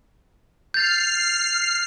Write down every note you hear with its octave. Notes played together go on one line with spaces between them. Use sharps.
F6 G6 A6 C7